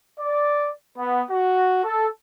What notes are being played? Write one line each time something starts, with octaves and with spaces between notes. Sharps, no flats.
D5
B3
F#4
A4